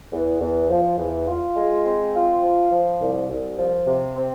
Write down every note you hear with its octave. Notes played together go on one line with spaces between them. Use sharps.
E2
E2
F3
E2
F4
G#3
C4
F4
F3
F3
C2
C2
F3
C3
C4